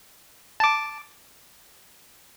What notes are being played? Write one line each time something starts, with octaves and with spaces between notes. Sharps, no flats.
A5 D6